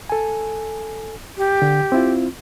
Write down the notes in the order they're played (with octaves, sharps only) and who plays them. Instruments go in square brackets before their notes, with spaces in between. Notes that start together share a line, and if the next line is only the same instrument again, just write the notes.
[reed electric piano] A4 G#5
[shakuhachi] G4
[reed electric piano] D3
C4 E4 F4